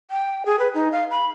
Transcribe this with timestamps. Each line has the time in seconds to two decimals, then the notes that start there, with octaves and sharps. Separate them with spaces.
0.11 G5
0.46 G#4
0.59 B4
0.74 D#4
0.92 F5
1.11 B5